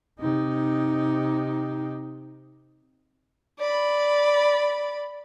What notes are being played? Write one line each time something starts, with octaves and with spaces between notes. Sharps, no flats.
C3 D#4
D5 B5